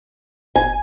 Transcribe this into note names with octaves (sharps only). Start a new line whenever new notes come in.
F#1 G#5